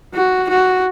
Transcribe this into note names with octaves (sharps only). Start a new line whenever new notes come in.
F#4
F#4